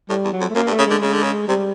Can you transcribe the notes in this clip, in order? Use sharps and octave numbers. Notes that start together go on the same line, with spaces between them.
A2 G3
E2
F#3
F2
A3
F#2 A#3
G2
A3
C#3
D3 G#3
C#3 G#3
D3
C#3
C3 G3